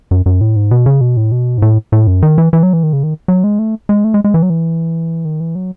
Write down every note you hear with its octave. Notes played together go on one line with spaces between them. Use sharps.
F#2
F#2
A2
G#2
B2
C#3
B2
A2
B2
G#2
A2
A2
F#2
D#3
E3
E3
F#3
E3
D#3
C#3
D#3
F#3
G#3
A3
G#3
A3
G#3
G#3
E3
F#3
E3
D#3
E3
F#3